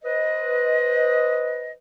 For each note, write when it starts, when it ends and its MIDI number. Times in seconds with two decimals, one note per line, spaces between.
0.04 1.73 71
0.04 1.73 72
0.04 1.73 75